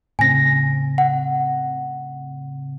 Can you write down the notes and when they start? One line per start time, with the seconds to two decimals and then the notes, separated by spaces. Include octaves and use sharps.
0.19 A2 C#3 C4 G#5 A#6
0.98 F#5